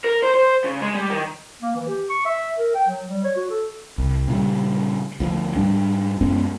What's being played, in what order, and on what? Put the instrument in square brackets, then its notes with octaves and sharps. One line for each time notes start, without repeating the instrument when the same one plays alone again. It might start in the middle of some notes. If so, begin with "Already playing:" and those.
[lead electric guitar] A#4
C5
C5
C#3
G#3
G3
D#3
[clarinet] A#3
E3
G4
C#6
E5
A#4
G5
F#3
G3
C#5
F#4
A4
[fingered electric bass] C2
A#2 C#3 E3 G3
D2 F3
G#2 G3 D4
F#2 G#3 B3 C#4